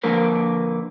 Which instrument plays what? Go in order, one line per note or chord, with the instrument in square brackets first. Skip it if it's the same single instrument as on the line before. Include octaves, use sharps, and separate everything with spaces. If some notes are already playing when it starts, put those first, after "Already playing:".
[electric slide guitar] D3 F3 A#3 A#4 B4